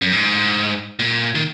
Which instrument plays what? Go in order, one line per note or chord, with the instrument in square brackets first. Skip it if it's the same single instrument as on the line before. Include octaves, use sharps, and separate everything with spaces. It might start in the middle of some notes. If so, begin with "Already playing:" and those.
[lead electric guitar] F#2
G#2
A#2
D#3